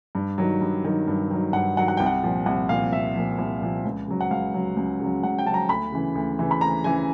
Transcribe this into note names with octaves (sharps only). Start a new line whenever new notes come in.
G2
D#3 F#3
G2
D#3 F#3
G2
D#3 F#3
G2 F#5
D#3 F#3 F#5
F#5
C2 G5
F#5
A#2 F3
C2 F#5
A#2 F3 F5
C2 E5
A#2 F3
C2
A#2 F3
C#2
C#3 F#3
F#5
C#2 F5
C#3 F#3
C#2
C#3 F#3
C#2 F#5
G5
C#3 F#3 A5 A#5
D2 B5
C#3 E3
D2
C#3 E3
B5
D2 A#5
C#3 E3 G#5